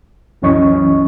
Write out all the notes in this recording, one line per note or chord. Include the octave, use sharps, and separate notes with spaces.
C2 F#2 E3 C#4 D#5 C#6